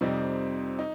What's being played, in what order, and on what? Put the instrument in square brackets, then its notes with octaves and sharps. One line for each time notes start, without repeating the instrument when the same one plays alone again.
[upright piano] F2 C3 G3 C4 D#4
D#4